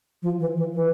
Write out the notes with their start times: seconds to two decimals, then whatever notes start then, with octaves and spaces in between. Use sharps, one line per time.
0.22 F3
0.40 E3
0.57 E3
0.74 E3